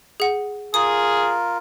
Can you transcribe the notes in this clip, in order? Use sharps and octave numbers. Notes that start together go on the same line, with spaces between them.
G#4 F#5
F4 G#4 A#4 D#6